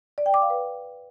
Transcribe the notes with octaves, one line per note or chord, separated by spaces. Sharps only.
D5
G5
D6
F5
B4